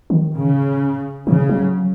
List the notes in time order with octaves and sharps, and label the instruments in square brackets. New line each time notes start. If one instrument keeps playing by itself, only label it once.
[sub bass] D#3
[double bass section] C#3
[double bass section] C#3 [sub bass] E3
[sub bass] F#3